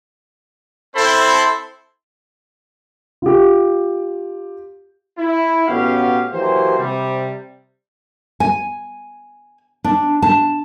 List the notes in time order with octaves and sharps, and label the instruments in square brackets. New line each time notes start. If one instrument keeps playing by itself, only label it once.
[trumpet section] C4 E4 A4 C5 B5 C6
[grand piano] F4 G4
[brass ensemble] E4
A1 B3 C#4 F#4 G4 F5
E3 F#3 A#3 G4 C5
C3 G3
[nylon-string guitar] G#5
D4
A5